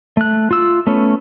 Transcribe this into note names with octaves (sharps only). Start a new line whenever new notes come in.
A3 F#6
F4 E6
A3 B3 C#4